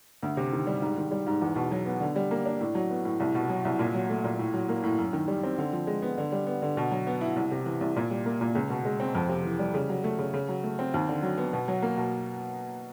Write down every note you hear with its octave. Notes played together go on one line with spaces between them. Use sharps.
D2
C3
D#3
G3
G#2
D#3
G3
G#2
E2
B2
F#3
B3
D3
G3
A#3
D4
A2
F#3
B3
A2
C2
B2
F#3
C2
A#2
F#3
A3
A#2
A2
F#3
A#3
A2
F#2
D#3
G3
C4
D3
F3
G#3
B3
D3
G3
B3
D3
B2
F#3
B3
E4
C2
C3
E3
C2
A#2
G3
A#3
A#2
C#2
B2
G#3
C4
F2
C3
E3
G3
C#3
F#3
A3
C#3
C#3
F#3
A3
C4
D#2
D3
F#3
B3
B2
F#3
A#3
B2